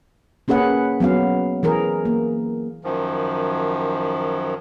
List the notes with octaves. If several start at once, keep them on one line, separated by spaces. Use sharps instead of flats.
A#3 C#4 G#4 B4 F#5
F#3 B3 C#4 F5
E3 G#4 A#4
A#3
F#2 D#3 F3